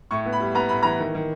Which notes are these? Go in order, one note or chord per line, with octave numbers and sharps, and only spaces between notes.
A2 C#6
B3
B5
G3
B3 A#5
A2 B5
E3 A#5
D#3
D#3